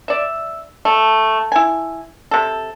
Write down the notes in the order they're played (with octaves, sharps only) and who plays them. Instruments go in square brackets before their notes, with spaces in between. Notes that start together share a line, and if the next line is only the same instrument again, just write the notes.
[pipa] D5 E5
A3
E4 G#5
C3 A4